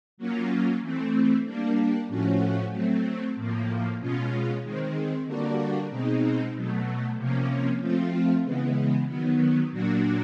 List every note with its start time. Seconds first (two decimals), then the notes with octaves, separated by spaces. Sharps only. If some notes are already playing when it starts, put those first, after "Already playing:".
0.18 F#3 A#3 C#4 F4
0.81 E3 A3 C4
1.45 G3 A#3 D4
2.08 A2 F3 A3 C#4 F#4
2.72 F#3 A3 C4
3.36 A2 F3 A#3
3.99 B2 G#3 C#4 F4
4.63 D#3 G#3 C4
5.26 D3 G3 A#3 D4 F#4
5.90 B2 G#3 C4 D#4
6.54 B2 F#3 A3
7.17 C3 F3 A#3 C#4
7.81 F3 A3 C4 F4
8.44 C#3 E3 G#3 B3
9.08 D#3 F#3 B3
9.71 A#2 F#3 A#3 D4 F#4